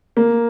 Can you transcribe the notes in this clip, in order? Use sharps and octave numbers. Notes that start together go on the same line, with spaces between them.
A#3